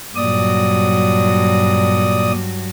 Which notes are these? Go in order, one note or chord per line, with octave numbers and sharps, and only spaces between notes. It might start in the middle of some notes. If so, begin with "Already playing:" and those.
G2 A#2 F#3 D5 D#6